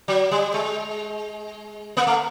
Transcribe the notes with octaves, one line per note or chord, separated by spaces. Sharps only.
F#3
G3
G#3
A#3
A3